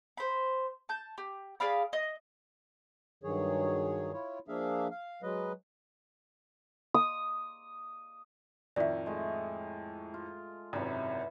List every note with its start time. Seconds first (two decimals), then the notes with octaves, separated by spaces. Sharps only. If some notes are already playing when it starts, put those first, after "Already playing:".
0.17 C5 B5
0.89 A5 G6
1.18 G4
1.60 G#4 D5 F5 B5
1.93 D#5
3.23 G2 D#3 F#3 G#4 C#5
4.13 E4 F4 C#5
4.48 F3 A#3 D4 G#4 E5 F5
4.91 F5
5.22 F#3 G#3 B4 D#5
6.94 D#6
8.76 F2 A2 D#3 D5 E5
9.06 G#3 A3
10.14 F4
10.73 G#1 F#2 C3 E3 B5